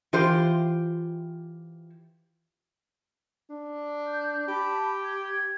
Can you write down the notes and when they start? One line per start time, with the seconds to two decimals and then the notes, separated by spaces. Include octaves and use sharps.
0.13 E3 F4 G4 C5
3.50 D4
4.08 G6
4.48 G4 A5 B5
5.04 G#6